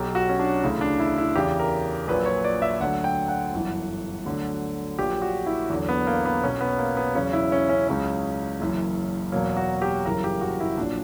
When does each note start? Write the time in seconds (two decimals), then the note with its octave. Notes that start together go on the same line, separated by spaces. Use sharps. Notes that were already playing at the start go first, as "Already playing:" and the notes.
Already playing: B1 B2 F#3 G4
0.15 F#4
0.29 C#4
0.39 D4
0.63 D2 C#3 E3
0.81 D4
0.99 E4
1.18 E4
1.35 E2 C#3 E3 G4
1.59 A#4
2.08 A#1 A#2 F#3 B4
2.26 C#5
2.44 D5
2.62 E5
2.80 D2 D3 F#3 F#5
3.04 G5
3.28 F#5
3.53 G1 F#2 E3
4.25 D2 D3 F#3
4.99 A#1 A#2 F#3 G4
5.22 F#4
5.46 E4
5.70 E2 D3 F#3
5.89 B3
6.07 A#3
6.25 B3
6.43 B1 B2 F#3 C#4
6.61 B3
6.78 A#3
6.97 B3
7.15 E2 C#3 F#3 C#4
7.33 E4
7.52 C#4
7.69 C#4
7.88 C#2 C#3 F#3 C#4
8.60 F#1 F#2 E3
9.32 E2 B2 F#3 A#3
9.57 F#4
9.82 G4
10.05 G1 F#2 C#3 E3 A#4
10.24 G4
10.41 F#4
10.60 E4
10.77 A#1 A#2 F#3 D4